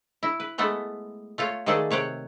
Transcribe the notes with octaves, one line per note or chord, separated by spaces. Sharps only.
E4
B4
G#3 A3 B3 A4
A3 F4 C#5
D#3 F3 A3 G#4 A4 D5
C3 C#5 F#5 G5